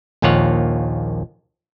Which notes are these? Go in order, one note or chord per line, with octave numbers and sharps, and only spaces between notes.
A#1 D#2 A#3 F4 C#5 F#5